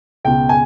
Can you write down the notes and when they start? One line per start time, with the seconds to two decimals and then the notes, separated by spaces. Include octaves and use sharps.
0.24 C#2 B2 G5
0.49 G#5